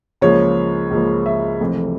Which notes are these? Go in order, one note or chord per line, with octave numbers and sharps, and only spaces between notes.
C#2 C#3 F3 A#3 C#5
C#2 C#3 F3 A#3
E5
F1 F2 E3 A3